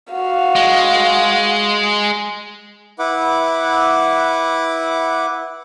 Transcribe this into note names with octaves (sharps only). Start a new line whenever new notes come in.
F#4 F5
G#3
E4 B4 F#5 D6